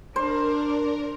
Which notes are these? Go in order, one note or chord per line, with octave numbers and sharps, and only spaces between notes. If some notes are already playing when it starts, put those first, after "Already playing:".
D4 A#4 C5